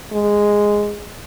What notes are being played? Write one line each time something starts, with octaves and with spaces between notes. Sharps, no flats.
G#3